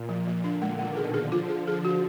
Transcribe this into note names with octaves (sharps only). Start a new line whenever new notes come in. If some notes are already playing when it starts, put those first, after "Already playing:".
Already playing: A#2
F3
F3
D3 D4
G#3
B2 D#3 G#3
G#4
D3 F3 G#4
F4
G#4
G#4
F#4